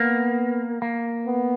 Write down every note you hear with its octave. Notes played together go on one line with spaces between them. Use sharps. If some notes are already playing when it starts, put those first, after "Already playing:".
Already playing: A#3 B3
A#3
B3